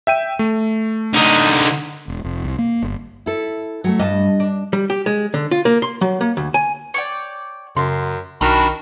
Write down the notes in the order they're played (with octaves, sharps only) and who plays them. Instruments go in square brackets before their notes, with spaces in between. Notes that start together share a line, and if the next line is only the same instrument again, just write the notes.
[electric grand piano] E5 G5 D#7
A3
[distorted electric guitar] D3 D#4
[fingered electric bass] E1
F1
C2
A#3
G1
[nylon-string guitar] E4 A4
F#3 G#3 A3
[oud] G2 [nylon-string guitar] D#5 G#5 A5
[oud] D4
[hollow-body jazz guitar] G3
G4
G#3
D3
F4
A#3
C6
F#3
A#3
D2
G#5
[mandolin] C#5 D5 G5
[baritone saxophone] F#2 [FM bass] C#3 [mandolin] C6
[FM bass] B1 [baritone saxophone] D#3 [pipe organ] D4 F#4 [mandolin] B5 C#6 F6